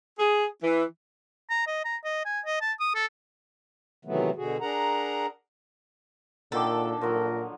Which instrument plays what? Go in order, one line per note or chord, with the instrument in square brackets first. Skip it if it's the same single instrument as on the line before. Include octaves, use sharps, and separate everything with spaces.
[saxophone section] G#4
E3
[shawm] A#5
D#5
A#5
D#5
G#5
D#5
A5
D#6
A4
[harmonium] C3 D#3 E3 F#3 A3 B3
B2 D3 F#4 G#4
D4 G#4 A#4 F#5 A#5
[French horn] A#2 [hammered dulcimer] D3 D#3 D6 [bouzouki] A4
[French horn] A#2 [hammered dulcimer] F3 F#3 [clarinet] A#4